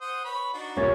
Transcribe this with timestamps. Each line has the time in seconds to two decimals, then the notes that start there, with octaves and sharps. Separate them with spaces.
0.01 C5 F#5 D#6
0.24 B4 C#5 B5
0.53 D4 D#4 F#4
0.77 C2 A#2 A#3 C#4 C#5 A6